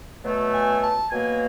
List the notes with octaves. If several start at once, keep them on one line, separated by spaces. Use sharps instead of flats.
B2 F#3 A3
G#5
A5
B2 F#3 A#3 G#5